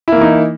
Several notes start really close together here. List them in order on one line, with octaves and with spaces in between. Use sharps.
E4 A#3 E3 D#4